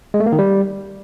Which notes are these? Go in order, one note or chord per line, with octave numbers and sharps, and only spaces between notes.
G#3
A3
A#3
D#3
G3